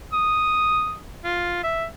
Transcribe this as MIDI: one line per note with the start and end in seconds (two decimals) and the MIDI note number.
0.13 0.95 87
1.24 1.60 65
1.63 1.85 76